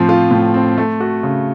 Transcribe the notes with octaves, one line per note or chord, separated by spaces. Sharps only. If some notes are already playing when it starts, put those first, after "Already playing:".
Already playing: A2 F3 C4
F4
A2
C4
A3
F#4
C#3